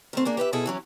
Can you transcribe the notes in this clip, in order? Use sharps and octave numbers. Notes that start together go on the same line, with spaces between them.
D#3 A3 C4
A#3 D4 G#4
G4 B4 C5 E5
B2 E4 G#4 A4
E3 F#3 C#4